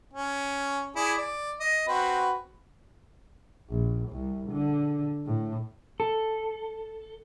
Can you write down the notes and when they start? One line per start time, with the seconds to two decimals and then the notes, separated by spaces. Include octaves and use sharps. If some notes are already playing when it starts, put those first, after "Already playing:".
0.13 C#4
0.96 E4 G#4 D5
1.18 D5
1.60 D#5
1.88 C4 F#4 B4
3.70 A#1
4.09 C2
4.51 D3
5.26 A2
6.00 A4